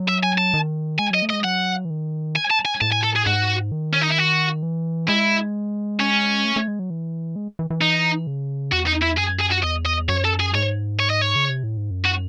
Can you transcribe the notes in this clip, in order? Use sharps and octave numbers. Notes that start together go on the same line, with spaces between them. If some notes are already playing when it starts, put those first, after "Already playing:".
Already playing: F#3
E5
G#5
A5
D#3
G#3 G#5
F#3 D#5
A3
D#5
G#3
F#3 F#5
E3
D#3
G#5
A5
G#5
A2 A5
G#5
A4
G#4
G#2 F#4
D#3
C#4
D#4
E4
F#4
E3
G#3 E4
C#4
A3
A3
G#3
F#3
E3
G#3
E3
E3
D#4
C#3
E2 F#4
D#4
E4
F#2 G#4
G#4
F#4
E2 D#5
D#5
F#2 C#5
A4
G#4
G#2 C#5
C#5
D#5
C#5
C#3
C3
A2
G#2
F#2
F#4